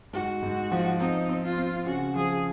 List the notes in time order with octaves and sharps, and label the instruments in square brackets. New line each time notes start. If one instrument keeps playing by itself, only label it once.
[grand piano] G#2 [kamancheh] F#4
[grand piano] G#2
F3
[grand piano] C4 [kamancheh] D#4
[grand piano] C4
[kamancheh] F4
[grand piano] C4
[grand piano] C#3 [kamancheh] F#4
[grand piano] F3 [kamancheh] G#4